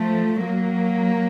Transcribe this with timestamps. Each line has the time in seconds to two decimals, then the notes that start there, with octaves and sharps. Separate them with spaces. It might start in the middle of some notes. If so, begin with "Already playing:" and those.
Already playing: F3 A3
0.44 F#3 A#3